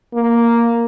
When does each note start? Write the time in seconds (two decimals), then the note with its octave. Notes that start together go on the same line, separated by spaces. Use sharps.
0.14 A#3